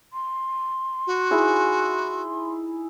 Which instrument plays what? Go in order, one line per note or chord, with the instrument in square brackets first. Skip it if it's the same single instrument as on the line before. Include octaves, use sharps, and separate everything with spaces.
[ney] C6
[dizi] F#4
[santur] D#4 E4 G#4